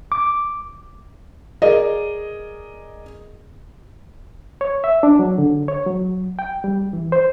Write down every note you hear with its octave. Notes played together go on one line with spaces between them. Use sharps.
D6
G#4 A#4 D5 D#5
C#5
E5
D4
F#3
D3
C#5
F#3
G5
G3
E3
C5